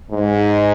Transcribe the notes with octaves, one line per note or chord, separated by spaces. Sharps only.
G#2